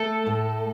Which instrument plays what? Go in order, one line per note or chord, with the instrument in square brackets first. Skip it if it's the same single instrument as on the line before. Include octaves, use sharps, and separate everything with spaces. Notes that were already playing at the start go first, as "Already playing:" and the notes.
Already playing: [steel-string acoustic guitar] A3 [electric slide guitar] A4
[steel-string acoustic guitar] A2